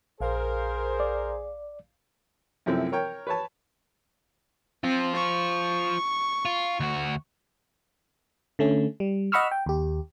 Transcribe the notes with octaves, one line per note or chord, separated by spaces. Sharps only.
A#1 G#4 A#4 C5 F5
D5
F#2 C3 F3 A3 C4 E4
A#4 C#5 G5
B4 C#5 A5
C4 F4 C5
C#6
F4
D2 F#4
D3 A3 C#4
G3
D#5 F#5 B5 C#6 E6 F6
G5
D#2 G4